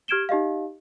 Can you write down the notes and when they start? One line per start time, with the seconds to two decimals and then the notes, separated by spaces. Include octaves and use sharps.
0.08 G4 F6 G#6 D7 E7 G7
0.29 D#4 G4 D#5 F5